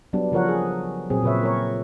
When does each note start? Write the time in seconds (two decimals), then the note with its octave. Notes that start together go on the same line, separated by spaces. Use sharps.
0.13 F#3 G3 B3 D4
0.32 C#3 F3 A#4 C#5 F#5
0.48 G#4
1.10 A#2 F#3 C4 G#4
1.23 A#2 C#3 B4 C#5 E5
1.43 A#4 C#5